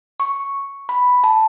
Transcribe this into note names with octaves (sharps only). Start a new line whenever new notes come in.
C#6
B5
A5